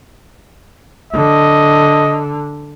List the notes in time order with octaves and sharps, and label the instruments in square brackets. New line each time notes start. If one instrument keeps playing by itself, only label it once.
[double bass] D3 [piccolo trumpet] D#5